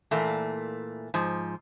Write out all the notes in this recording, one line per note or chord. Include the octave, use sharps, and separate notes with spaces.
A#2 E3 A3 A#3
G#2 F3